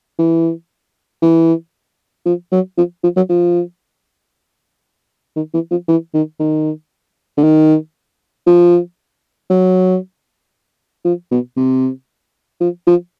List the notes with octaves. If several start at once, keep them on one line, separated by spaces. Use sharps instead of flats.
E3
E3
F3
F#3
F3
F3
F#3
F3
D#3
E3
F3
E3
D#3
D#3
D3
D#3
F3
F#3
F3
B2
C3
F3
F3